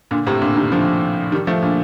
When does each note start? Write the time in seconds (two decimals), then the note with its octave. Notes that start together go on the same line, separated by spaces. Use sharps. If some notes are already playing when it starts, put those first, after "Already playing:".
0.11 A#2 D3
0.27 A2 C3
0.41 A#2 D3
0.57 C3 D#3
0.72 D3 F3
1.32 D#3 G3
1.47 F3 A3
1.63 A#2 D3